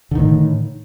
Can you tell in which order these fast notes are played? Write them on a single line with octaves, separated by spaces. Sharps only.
D3 D#3 A2